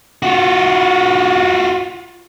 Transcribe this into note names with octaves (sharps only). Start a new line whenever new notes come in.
F4 F#4